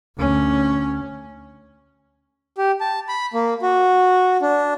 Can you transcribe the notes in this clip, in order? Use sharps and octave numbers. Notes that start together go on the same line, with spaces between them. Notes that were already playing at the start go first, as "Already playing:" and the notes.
D2 C#4
G4
A5
B5
A#3
F#4
D4